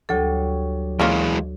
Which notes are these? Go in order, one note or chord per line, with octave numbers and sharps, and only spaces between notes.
D2 F#3 G3 A4
E3 G#3 A#3 C#4 F4